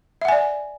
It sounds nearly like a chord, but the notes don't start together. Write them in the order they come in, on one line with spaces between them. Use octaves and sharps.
E5 F#5 G#5 D5